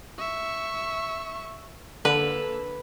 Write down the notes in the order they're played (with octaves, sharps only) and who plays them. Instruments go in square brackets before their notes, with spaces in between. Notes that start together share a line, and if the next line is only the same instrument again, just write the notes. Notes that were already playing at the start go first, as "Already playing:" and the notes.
[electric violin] E5 C#6
[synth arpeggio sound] D3 [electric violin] A#3 A4 [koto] B4